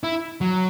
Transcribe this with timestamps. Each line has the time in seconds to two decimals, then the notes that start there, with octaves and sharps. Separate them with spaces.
0.03 E4
0.41 F#3